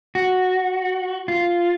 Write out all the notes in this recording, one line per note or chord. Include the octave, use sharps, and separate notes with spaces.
F#4
F4